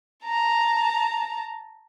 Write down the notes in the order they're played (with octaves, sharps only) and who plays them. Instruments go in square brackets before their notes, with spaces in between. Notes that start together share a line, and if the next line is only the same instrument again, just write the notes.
[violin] A5 A#5